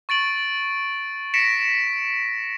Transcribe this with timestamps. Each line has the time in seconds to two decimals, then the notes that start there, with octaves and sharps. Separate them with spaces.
0.09 C#6 A6 D7 F#7
1.34 A#6 B6 C#7 D7 E7